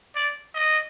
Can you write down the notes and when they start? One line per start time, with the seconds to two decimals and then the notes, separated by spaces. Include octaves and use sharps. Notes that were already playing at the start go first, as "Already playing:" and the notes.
0.16 D5
0.54 D#5